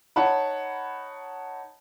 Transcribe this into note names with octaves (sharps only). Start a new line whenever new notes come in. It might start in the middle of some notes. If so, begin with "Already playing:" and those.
D#4 C#5 F#5 A5 B5